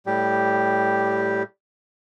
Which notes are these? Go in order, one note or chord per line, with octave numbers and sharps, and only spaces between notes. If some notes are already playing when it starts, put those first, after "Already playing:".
A2 G3 G4